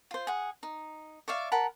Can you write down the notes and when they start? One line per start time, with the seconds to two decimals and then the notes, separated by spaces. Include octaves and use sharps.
0.11 F4 C5
0.27 G#4 F#5
0.63 D#4
1.28 C#5 D5 E5 F5
1.52 A#4 F#5 A5 B5